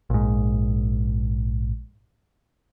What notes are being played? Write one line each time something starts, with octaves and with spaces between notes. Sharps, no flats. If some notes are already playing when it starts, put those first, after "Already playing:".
A#1 G#2